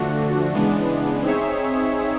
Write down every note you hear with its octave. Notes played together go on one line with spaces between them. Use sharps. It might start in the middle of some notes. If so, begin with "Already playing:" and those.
Already playing: D3 F3 A3 D4 F#4
C#3 E3 G#3 B3 D4
C4 D#4 G#4 C#5 E5